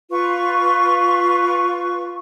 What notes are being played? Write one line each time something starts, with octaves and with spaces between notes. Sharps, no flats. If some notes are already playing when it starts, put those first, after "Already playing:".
F4 B4 C#6